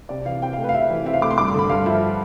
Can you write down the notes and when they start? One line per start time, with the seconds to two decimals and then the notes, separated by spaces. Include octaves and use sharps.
0.09 C3 D5
0.25 E3 F5
0.41 C4 G5
0.53 A3 F5
0.64 B4
0.69 F5
0.74 C3 E5
0.90 E3
1.06 C4 E5
1.14 F5
1.21 A3 D6
1.31 C6
1.38 G2 D6
1.48 C6
1.54 D3 B5
1.69 G2 F5
1.86 F3 E5